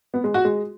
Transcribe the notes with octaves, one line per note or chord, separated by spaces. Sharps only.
B3
G#3
F#4
G#3